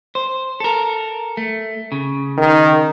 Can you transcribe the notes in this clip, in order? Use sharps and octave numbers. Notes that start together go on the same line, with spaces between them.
C5
A4 A#4
A3
C#3
D#3